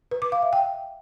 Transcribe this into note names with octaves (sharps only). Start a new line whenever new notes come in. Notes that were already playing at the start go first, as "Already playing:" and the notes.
B4
D6
F5
E5
G5